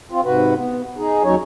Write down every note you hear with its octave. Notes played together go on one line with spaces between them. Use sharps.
C4 F4
G#2 C3 F#4 B4
B3
D#4 G#4
D#2 F#3 C#4 D#4 C#5